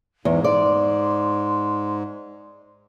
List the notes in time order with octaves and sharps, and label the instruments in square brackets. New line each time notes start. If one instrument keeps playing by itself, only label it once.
[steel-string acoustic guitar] E2 [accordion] G#2
[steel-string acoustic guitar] D5 [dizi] C6